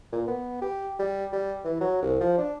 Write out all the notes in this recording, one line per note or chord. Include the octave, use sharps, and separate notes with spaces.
A#2
B3
G4
G3
G3
E3
F#3
C2
F3
D4